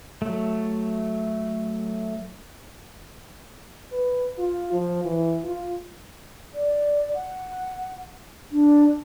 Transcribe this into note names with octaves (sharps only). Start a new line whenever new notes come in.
F#3 A3
B4
F4
F3
E3
F4
D5
F#5
D4